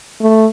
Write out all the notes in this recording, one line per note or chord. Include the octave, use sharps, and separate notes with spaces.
A3